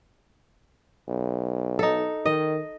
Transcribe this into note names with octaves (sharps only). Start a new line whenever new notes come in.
B1
D#4 A4
D#3 D#5